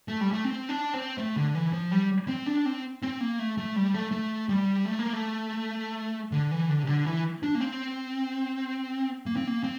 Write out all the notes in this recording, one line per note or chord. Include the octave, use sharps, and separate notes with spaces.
A3
G3
A3
C4
D4
C4
A3
D3
E3
F3
G3
C4
D4
C4
C4
A#3
A3
A3
G3
A3
A3
G3
A3
A#3
A3
D3
E3
D3
C3
D3
E3
D4
A#3
C4
A#3
C4
A#3
C4